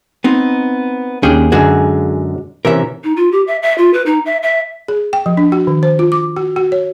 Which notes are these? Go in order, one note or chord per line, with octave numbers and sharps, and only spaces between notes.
B3 C4 D#4
D#2 C#4 D4 G#4 G5
F#2 D3 G#3 F#4 G#4
C3 E3 C#4 A#4 E5
D#4
F4
G4
E5
E5
F4
B4
D#4
E5
E5
G#4
G5
F3
D4
F#4
D#3
C5
F4
D6
F#4
F#4
C#5